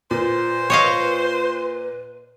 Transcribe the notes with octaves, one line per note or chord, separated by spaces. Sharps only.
A#2 B4 C5
C#5 D#5 F5